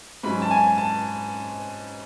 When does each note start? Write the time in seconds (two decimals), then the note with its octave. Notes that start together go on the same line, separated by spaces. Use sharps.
0.23 G#2 F#3 C#4 B5
0.42 A5
0.51 G#5
0.78 A5